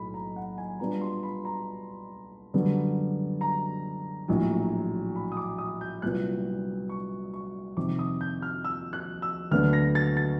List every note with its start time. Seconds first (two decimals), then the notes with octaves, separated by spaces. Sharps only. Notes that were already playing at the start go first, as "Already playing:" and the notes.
Already playing: B1 A2 B5
0.14 A#5
0.36 F#5
0.58 G#5
0.80 A#2 G3 B3 D4 F4 A#5
1.01 C6
1.23 B5
1.45 A#5
2.54 F#2 D3 G3 B3
3.41 A#5
4.28 A#1 A2 F#3
5.16 B5
5.32 D#6
5.37 D6
5.58 D#6
5.81 G6
6.02 C2 A#2 F#3 B3 F#6
6.89 C#6
7.34 C#6
7.77 F2 C3 D#3 D6
7.99 D#6
8.21 G6
8.42 F6
8.65 E6
8.93 F#6
9.22 E6
9.51 D2 D3 F#3 B3 D4 F6
9.73 A#6
9.95 A6
10.17 A6